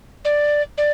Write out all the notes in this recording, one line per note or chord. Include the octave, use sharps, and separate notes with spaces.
D5
D5